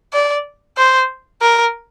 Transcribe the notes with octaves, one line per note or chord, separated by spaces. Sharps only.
D5
C5
A#4